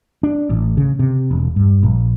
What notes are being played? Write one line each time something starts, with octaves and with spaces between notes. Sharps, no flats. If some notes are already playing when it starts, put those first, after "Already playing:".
D4
A1
C#3
C3
E1
G2
A#1